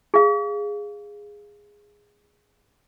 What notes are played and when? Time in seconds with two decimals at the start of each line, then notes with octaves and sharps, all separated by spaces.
0.14 G#4 F5